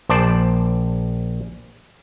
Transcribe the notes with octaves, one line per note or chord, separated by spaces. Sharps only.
A#1 C5 D5 A5